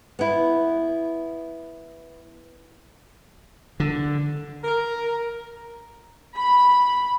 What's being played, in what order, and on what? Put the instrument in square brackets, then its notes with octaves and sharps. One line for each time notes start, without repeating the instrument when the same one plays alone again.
[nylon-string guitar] B3 E4
[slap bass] D3
[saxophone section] A#4
[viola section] B5